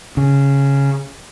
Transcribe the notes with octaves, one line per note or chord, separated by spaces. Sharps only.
C#3